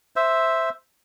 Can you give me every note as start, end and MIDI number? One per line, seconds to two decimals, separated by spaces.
0.16 0.70 72
0.16 0.70 76